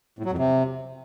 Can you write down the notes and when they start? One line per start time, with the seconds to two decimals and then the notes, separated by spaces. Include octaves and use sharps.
0.19 A2
0.25 F#3
0.32 F2
0.38 C3